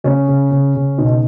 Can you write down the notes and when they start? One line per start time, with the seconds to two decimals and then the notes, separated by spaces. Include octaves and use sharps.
0.04 C#3 C#4
0.28 C#3
0.51 C#3
0.75 C#3
0.97 B2 D#4